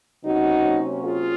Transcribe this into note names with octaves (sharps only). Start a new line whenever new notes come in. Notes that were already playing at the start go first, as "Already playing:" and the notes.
C3 F#3 A#3 C#4 D#4 F#4
F4 G#4